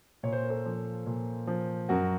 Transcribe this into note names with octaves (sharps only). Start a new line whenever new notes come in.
A#2 C#5
C5
A#4
A4 C5
F3
A#2
F3
F#2 F#4 A#4